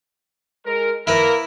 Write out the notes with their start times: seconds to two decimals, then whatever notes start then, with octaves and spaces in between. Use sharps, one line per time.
0.66 G#3 A#4
1.07 A#3 E4 A#4 B4